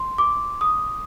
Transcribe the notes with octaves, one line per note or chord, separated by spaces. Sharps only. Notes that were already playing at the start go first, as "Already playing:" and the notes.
Already playing: C6
D6
D#6